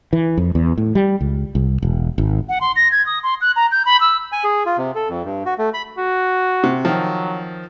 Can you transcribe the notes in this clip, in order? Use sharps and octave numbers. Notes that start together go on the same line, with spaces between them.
E3
F2
E2
A2
G3
C#2
C2
E1
G#1
F#5
C6
A#6
G#6
D#6
C6
F#6
A#5
G6
B5
E6
G#5
G#4
F4
C3
A4
F2
G2
F#4
A3
B5
F#4
C3
D#3 F3 F#3